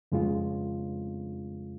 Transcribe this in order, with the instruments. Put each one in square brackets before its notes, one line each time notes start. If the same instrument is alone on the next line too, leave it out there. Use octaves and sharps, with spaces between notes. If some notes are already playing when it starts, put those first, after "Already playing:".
[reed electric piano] F2 C#3 G#3 F4